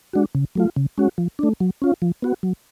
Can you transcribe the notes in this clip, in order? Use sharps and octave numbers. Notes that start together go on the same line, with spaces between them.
G#3 D4 F#4
C#3
F#3 A3 F4
C#3
G#3 C#4 F#4
F3
A3 D4
F#3
C#4 F4
F3
B3 F#4
F#3